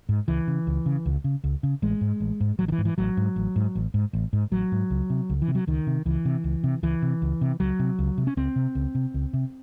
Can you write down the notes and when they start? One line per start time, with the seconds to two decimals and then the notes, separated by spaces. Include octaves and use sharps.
0.09 G#2
0.28 C#2 E3
0.47 C#3
0.67 C#2
0.86 C#3
1.06 C#2
1.24 C#3
1.44 C#2
1.63 C#3
1.82 A1 G#3
2.01 G#2
2.20 A1
2.40 G#2
2.59 A1 F#3
2.68 D#3
2.72 E3
2.78 G#2
2.85 E3
2.98 A1 F#3
3.17 G#2
3.36 A1
3.56 G#2
3.75 A1
3.94 G#2
4.13 A1
4.33 G#2
4.51 A1 F#3
4.72 G#2
4.90 C#2
5.10 C3
5.30 C#2
5.42 E3
5.48 C3
5.55 F#3
5.67 C#2 D#3
5.87 C3
6.05 C#2 E3
6.25 C3
6.44 C#2
6.64 C3
6.83 C#2 E3
7.02 C3
7.22 C#2
7.41 C3
7.60 C#2 F#3
7.79 C3
7.99 C#2
8.18 C3
8.27 C#4
8.37 C#2 C4
8.56 C3
8.75 C#2
8.95 C3
9.14 C#2
9.33 C3